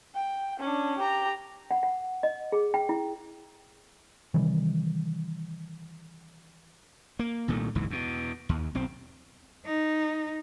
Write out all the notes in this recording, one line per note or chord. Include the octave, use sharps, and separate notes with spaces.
G5
C#4 D4
G4 A#5
F#5
F#5
D#5
G#4
G5
E4
C3 D#3 E3 G3
A#3
C2 A#2 D#3 A3
F#1 C#2 G#2 E3
E2 B2
D#2
B1 C4
D#4